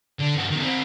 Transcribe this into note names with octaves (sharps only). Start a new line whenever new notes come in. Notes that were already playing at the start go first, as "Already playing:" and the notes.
D3
G2 F#4
B2 D#3
C4 A#4